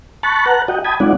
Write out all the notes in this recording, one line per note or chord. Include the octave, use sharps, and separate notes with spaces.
A5 B5 C#6 F#6 A6
B4 F#5 A5 A#5 F#6
F#4 D#5 F#5 G5
G5 A5 B5 D#6 G#6
G#3 C4 D#4 F4 D5 F#5